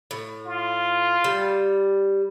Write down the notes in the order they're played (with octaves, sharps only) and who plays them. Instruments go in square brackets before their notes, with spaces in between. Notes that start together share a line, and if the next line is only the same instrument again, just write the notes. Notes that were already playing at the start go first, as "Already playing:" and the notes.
[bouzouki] A2
[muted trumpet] F4
[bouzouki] G3